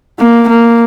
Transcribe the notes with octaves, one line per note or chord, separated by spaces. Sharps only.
A#3
A#3